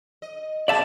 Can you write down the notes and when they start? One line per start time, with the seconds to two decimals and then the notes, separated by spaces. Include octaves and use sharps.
0.22 D#5
0.68 B2 C4 G#4 D5 E5 A5